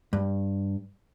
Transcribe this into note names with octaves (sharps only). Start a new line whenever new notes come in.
G2